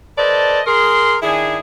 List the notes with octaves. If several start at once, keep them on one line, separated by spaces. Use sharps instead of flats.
A4 B4 C5 D5 D#5 A5
G#4 A#4 C6
D#3 D4 E4 G#4